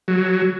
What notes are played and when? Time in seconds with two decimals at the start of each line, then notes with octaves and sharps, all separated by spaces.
0.08 F#3